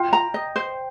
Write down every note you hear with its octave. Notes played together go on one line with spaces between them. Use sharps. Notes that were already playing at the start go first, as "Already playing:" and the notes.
Already playing: F4 G5
A#5
D#5
C5